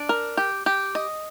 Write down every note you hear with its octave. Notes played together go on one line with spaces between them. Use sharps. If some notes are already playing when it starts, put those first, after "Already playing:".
Already playing: D4
A#4
G4
G4
D#5